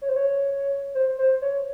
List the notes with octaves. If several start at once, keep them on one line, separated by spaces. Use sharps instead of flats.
C#5
C5
C#5
C5
C5
C#5